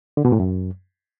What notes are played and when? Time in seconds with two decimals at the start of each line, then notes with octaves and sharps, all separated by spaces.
0.17 D3
0.25 B2
0.32 A2
0.40 F#2